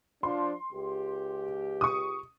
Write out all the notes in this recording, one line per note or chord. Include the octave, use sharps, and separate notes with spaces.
F3 D4 C6
C#2 G4
C#6 D#6